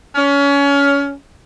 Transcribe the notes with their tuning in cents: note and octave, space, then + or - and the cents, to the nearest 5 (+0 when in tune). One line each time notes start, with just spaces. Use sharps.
C#4 +25